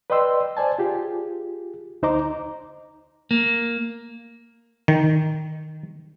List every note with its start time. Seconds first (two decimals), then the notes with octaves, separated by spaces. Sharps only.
0.10 B4 D5 D#5 G5 C6 E6
0.57 C5 D5 G#5 A5
0.79 F4 G4 G#4
2.03 D2 D#4 C5 D#5 A#5 D6
3.31 A#3
4.88 D#3